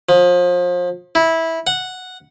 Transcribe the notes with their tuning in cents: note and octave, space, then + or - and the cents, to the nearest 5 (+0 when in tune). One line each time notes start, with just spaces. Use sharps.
F3 +30
E4 -15
F#5 -5